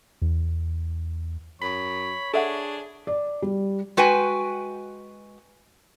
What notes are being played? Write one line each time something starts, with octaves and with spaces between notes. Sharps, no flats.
E2
F#2 C#5 B5
D4 G#4 A4 E5 F#5
D5
G3
G#3 F#4 B4 G5 G#5